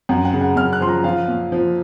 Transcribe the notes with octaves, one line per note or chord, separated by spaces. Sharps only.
F#2 F#5
F#5
C#3
F#5
F#2 F6
F#6
F3 C6
A#5
F3 F5
A#2
F3